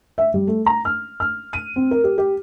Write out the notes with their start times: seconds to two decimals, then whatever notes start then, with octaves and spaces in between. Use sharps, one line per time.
0.18 E5
0.34 G3
0.47 A3
0.66 A#5
0.85 F6
1.20 F6
1.53 D#7
1.76 C4
1.91 A#4
2.04 G4
2.18 G4